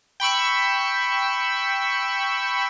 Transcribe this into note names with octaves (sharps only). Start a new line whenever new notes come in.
G5 B5 C#6 E6